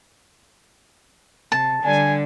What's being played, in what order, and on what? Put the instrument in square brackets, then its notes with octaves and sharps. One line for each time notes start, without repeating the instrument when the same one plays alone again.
[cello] C3 [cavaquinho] A5
[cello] D3 [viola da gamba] G3 D4 [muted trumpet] G#5